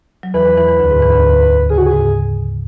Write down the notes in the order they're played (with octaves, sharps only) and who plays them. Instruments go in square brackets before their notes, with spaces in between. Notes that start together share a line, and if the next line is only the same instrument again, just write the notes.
[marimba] F#3
[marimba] E2 E3 [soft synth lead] B4
[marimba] E2 E3
E2 E3
E2 E3
D2 D3
G#2
E2 E3
D2 D3
[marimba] C#3 [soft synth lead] G#4
[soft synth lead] F#4
G#4
[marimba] G#2